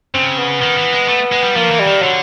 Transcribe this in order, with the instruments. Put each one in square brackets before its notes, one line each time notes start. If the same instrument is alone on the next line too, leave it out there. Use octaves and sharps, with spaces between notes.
[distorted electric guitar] C#3 [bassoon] C4
[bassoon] B3
[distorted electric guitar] D#3
E3
G#3
A3
G#3
G3
[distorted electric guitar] F3 [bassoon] A#3
[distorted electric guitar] E3
[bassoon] G3
[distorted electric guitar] D#3
[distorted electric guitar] D3 [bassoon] F#3